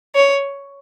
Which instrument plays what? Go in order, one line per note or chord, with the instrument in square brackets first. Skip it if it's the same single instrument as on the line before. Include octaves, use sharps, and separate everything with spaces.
[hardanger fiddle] C#5